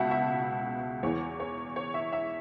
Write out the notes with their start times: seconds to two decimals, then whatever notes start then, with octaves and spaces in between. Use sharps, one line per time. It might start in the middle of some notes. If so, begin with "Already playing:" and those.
Already playing: C#2 B2 E5 F#5 A5
0.11 E5
1.03 E2 E3 C#5
1.40 C#5
1.76 C#5
1.94 E5
2.13 E5